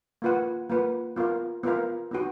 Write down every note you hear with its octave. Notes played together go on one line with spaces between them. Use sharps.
A#3 F4 B4 F#5
A#3 F4 B4 F#5
B3 F4 A#4 F5
B3 F4 A#4 F5
B3 D#4 F#4